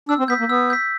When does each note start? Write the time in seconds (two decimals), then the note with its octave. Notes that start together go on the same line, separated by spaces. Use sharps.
0.09 D4 E6
0.19 C4
0.28 B3 G6 B6
0.39 A#3
0.49 B3 E6
0.70 G6 B6